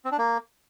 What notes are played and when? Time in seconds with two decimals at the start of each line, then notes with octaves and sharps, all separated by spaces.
0.05 C4
0.12 D4
0.18 A#3